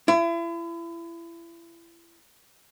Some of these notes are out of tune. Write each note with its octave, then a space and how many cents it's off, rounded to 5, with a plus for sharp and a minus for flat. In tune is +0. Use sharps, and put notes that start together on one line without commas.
E4 +35